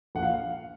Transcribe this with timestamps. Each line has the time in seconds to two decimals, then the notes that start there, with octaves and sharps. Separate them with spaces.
0.15 A#1 F#5
0.23 F5